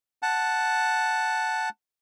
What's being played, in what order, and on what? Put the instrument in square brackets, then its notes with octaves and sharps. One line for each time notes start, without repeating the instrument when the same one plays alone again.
[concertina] F#5 A5